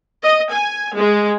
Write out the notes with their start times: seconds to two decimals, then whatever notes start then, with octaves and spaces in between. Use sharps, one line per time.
0.23 D#5
0.52 G#5
0.95 G#3